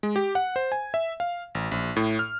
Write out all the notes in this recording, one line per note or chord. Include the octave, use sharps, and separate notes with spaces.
G#3
G4
F#5
C5
G#5
E5
F5
A1
A#1
A2
F6